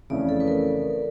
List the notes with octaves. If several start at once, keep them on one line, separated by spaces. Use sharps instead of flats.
F2 C#3 E3 A3 C#4 D5
A4
B4
A#4